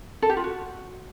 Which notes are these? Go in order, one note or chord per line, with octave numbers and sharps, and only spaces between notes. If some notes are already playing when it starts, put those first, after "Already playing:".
A4
G4
F4
F#4